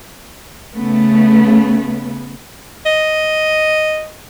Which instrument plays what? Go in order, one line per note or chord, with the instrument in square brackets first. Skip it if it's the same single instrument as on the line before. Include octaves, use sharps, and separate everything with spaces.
[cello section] C#3 A3 B3
[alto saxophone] D#5